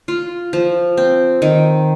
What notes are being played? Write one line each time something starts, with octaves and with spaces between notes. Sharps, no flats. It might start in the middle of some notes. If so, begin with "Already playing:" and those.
F4
F3
C4
D#3